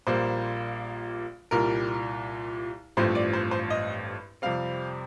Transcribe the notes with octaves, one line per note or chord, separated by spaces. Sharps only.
A#1 A#2 G3 A#3 C5
C2 A#2 G3 A#4
A1 G2 F3 A3 C4 C5
D5
C5
C5
D#5
F2 C3 G3 C4 F5